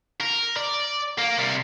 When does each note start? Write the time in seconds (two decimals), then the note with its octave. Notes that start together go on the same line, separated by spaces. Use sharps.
0.21 A#4
0.56 D5
1.18 A#3
1.38 C3 G3